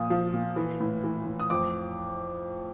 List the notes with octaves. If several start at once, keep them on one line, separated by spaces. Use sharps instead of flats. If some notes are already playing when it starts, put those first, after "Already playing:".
Already playing: A#2 F3 D#6
F3
A#2
E3
A2
E3
A2
D#6
F2 D6